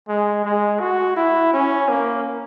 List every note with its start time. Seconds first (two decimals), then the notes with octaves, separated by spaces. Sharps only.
0.09 G#3
0.45 G#3
0.80 F#4
1.17 E4
1.53 C#4
1.89 A#3